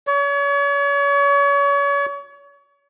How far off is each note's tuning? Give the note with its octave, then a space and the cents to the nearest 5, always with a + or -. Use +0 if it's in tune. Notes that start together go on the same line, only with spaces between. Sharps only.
C#5 +35